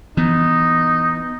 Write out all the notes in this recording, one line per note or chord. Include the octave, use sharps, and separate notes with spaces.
E3 B3 D#4